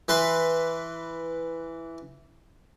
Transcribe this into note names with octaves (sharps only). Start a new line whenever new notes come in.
E3 B4 C6